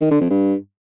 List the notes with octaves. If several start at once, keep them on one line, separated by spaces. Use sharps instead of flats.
D#3
D3
F2
G2